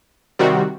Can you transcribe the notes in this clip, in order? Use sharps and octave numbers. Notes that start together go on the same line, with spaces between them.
C3 D#3 G3 C4 F#4